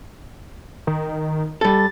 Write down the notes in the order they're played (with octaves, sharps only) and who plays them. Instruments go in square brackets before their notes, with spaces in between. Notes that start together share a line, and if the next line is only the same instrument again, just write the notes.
[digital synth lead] D#3
[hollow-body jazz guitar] G3 A4 [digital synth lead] A6